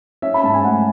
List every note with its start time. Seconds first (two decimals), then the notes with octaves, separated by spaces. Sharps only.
0.22 C#4 E5
0.34 B5
0.44 G#2 A5
0.54 G#5
0.64 A3 F#5